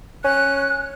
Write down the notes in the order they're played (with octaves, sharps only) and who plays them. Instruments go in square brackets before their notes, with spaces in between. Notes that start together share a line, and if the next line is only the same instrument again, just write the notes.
[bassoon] C#4 [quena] F#6